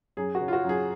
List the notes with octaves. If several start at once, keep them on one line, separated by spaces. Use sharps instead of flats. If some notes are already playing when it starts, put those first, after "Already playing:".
F#2 G#4
F#4
C#3
F4
F#4
F#2 G#4